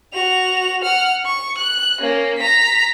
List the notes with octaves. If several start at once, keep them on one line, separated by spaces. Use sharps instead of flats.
F#4 F7
F#5 F6
C#6
F#6
A#3 C#4
A#5 B6